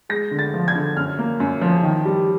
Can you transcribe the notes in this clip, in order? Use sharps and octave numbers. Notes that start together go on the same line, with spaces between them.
G#3 A#6
D3
A6
F3
G#6
D3
F#2 F6
A#3
F#2
F3
D#3
G3